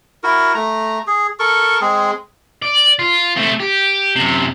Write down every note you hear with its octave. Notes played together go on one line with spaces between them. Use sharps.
E4 F#4 A#4
A3 A#5
G#4
A4 A#4 C#6
G#3 C4 G#4
D5
F4
A3 C4
G4
F#2 C3